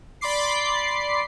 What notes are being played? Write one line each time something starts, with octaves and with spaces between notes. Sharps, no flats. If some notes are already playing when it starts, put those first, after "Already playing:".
D5 B5 C6 D6 C7